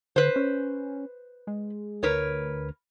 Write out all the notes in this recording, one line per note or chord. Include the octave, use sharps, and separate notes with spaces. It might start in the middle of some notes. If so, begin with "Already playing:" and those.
D3 B4 C5
C#4
G#3
D2 A#4 B4 C#5